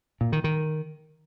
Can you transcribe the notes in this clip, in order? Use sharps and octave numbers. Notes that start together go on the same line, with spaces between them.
A#2
D#3
D#3